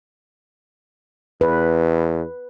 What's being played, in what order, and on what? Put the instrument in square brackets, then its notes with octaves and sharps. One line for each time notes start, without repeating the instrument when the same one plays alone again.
[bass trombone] E2 [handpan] B4